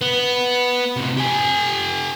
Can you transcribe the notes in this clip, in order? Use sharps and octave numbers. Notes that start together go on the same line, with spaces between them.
B3
A2 C3
G4 G#5